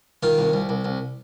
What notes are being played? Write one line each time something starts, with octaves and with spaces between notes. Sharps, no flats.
D#3 F4
C2
C2
C2
C2